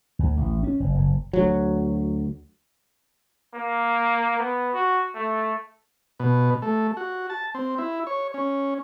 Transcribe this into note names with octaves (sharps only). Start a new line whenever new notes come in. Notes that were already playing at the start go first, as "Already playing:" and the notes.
D2
A1
C#4
F#1
F#1
D2 F#3
A#3
B3
F#4
A3
B2
A3
F#4
A5
C4
E4
C#5
C#4